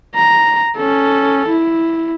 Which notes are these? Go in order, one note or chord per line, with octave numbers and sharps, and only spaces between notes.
A#5
C#4 A4
E4